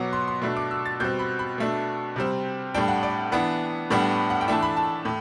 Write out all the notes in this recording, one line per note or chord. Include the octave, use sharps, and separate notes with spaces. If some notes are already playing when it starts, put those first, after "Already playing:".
Already playing: B2 F#3 B3 D6
C6
C6
B2 A3 D4 B5
D6
E6
A6
B2 G3 C4 G6
B5
B5
B2 A3 D4
C3 G3 C4
A2 G3 D4 G5
F#5
D5
E3 B3 D4 B5
A2 G3 B3 D4
F#5
G5
E3 A3 D4 A5
B5
A5
A2